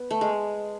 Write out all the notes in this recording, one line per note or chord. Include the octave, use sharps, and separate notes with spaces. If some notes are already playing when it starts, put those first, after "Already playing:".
Already playing: B3
A3
G#3